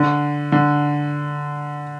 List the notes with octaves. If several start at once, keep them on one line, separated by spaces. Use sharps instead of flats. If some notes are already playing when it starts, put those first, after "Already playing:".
Already playing: D3
D3